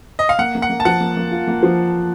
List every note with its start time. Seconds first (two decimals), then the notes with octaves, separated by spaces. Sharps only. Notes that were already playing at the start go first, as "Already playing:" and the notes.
0.19 D#5
0.29 F5
0.39 A#3 F#5
0.55 A#3
0.62 F#5
0.70 A#3
0.80 A5
0.85 F3 F#5
1.00 A#3
1.17 A#3
1.31 F4
1.47 A#3
1.63 F3